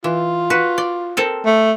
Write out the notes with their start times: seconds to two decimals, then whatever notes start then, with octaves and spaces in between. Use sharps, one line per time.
0.04 E3 F4
0.50 F#4 B4
0.78 D5
1.17 C4 A4 A#4
1.45 A3